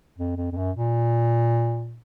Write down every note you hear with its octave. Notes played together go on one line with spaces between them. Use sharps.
F2
F2
F2
F#2
A#2